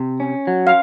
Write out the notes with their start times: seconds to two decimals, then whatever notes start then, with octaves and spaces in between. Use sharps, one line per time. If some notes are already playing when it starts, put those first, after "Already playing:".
Already playing: C3
0.20 C#4
0.47 F#3
0.67 F5